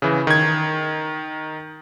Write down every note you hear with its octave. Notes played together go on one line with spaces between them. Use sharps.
C#3 E3
D#3 G#6